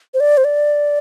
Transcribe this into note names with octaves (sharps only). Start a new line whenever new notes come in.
C5
D5
C5
D5